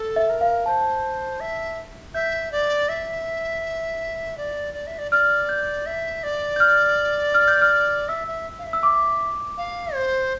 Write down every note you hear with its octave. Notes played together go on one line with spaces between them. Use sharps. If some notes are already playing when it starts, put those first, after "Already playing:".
Already playing: A4
E5
A#4
F5
C5 A5
E5
E5 G6
D5
E5
D5
D5
E5
D5
D5 F6
G6
E5
D5
G6
F6
F6
G6
F6
E5 E6
E5
F5
E5
E6
D6
F5
C5